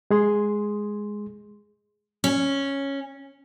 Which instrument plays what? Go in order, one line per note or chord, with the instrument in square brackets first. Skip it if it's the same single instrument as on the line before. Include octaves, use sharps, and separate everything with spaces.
[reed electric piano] G#3 G#4 C6
[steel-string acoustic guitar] C#4